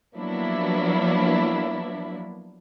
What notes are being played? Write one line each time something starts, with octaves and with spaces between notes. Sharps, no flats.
F3 F#3 A#3 B3 D4 E4